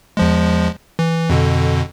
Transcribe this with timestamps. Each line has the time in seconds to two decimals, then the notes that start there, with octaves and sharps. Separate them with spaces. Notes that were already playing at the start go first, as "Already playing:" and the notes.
0.17 E2 F3 G#3
0.99 E3
1.30 F2 B2 D3